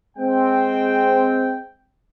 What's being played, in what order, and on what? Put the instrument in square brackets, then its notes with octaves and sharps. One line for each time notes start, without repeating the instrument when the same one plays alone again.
[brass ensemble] G#3 C4 G5